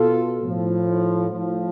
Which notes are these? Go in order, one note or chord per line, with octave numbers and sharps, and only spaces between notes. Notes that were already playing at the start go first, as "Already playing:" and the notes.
Already playing: B2 F4 A4
A2 F3
A2 F3